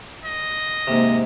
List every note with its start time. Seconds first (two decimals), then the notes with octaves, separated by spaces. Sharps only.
0.25 D#5
0.87 G#2 C3 A#3